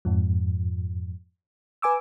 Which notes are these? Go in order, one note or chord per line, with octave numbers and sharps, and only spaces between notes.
F2 G#2 F3
B4 G#5 D6 E6